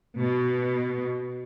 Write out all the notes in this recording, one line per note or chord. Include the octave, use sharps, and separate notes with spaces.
B2